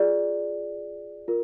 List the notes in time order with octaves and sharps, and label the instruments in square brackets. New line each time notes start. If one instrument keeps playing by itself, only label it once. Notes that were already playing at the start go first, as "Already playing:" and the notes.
Already playing: [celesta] F4 G#4 D5
F4 A#4